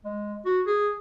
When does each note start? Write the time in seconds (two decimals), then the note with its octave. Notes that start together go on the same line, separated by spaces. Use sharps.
0.04 G#3
0.45 F#4
0.66 G#4